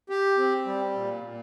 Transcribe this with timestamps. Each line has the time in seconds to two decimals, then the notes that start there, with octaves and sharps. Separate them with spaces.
0.09 G4
0.37 C4
0.66 G3
0.95 A#2
1.23 A#2